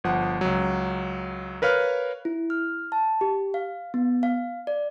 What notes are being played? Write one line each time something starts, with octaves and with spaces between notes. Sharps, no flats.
G1 F3 F#5
C#2 F#3
A#4 B4 C#5 F5 F6
E4
F6
A5
G4
F5
B3
F5
D5